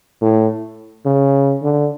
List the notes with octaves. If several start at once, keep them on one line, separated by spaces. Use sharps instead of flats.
A2
C#3
D3